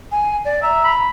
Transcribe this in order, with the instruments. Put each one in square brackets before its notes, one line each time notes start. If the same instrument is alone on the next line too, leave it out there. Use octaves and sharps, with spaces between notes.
[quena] G#5
D5
[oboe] E5 [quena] A#5
[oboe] B5